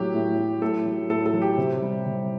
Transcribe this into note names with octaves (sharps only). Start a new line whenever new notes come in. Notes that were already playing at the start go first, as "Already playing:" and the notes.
Already playing: A2 F#3 G4
A2
F#3
A2 A4
F#3
A2 A4
A4
F#3
G4
C3
G3
C3